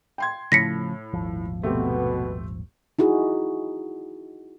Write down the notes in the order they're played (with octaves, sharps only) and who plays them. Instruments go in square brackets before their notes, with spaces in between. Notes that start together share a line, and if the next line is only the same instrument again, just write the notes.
[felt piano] G5 C6 G#6
[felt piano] A2 [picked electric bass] C#3 F3 A3 [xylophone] A#6 B6 C#7
[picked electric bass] D#1 G#1 F3
[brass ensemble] B2 B3 [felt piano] A3 C4 G4
[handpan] D#4 E4 F#4 G#4